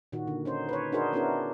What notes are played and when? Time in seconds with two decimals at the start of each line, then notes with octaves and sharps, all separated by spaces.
0.12 A#2 D#3 F#4
0.27 D3
0.45 C#4 D#4 C5
0.69 B4 C#5
0.92 D4 D#4 F#4 G#4 A#4 C5
1.13 B3 C#4 D4 E4 F#4 A#4